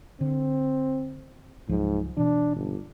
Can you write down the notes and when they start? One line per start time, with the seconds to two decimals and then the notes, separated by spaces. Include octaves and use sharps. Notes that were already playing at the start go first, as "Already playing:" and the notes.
0.21 D3 C4
1.69 C#2 G#2 F3 F#3
2.17 B2 E3 D4
2.56 G1